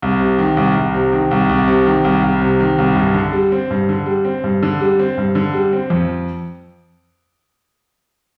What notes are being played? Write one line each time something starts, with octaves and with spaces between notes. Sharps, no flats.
C2
C3
D#3
C2
C2
C3
D#3
C2
C2
C3
D#3
C2
C2
C3
D#3
C2
G2
D3
G3
C4
G2
D3
G3
C4
G2
D3
G3
C4
G2
D3
G3
C4
F2